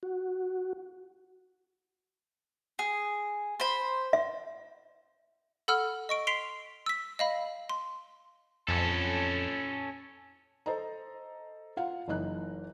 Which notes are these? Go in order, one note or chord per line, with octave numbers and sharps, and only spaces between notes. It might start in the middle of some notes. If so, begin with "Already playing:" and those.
F#4
G#4
C5 B5
E5
A4 F#5 B5 E6 F6
D#5 C#6 D7
C6 B6 C7 D7 F7 G7
E6 B6
D#5 F5 B5
C6
F2 C#4 A4
A4 C5 D#5 A#5
F4 F5 F#5
F#1 E3 D#4 F#6